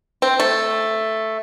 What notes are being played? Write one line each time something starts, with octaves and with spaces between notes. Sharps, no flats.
C4
A3